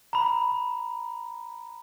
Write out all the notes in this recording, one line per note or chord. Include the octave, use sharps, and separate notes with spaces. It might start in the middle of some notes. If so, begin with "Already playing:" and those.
A#5 B5